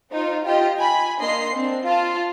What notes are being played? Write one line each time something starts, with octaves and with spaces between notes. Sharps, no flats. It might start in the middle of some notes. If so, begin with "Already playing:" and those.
D#4 F4 C5
F4 G4 D#5 G5
G#5 B5
A#3 D4 D#5 C6 C7
C4 D4
F4 A5